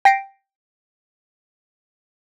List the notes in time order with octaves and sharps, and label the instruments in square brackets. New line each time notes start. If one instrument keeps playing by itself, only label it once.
[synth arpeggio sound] G5 A#6 C7 D7